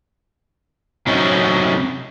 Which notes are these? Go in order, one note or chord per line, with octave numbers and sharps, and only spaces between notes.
C3 F#3 G#3 C#4 D#4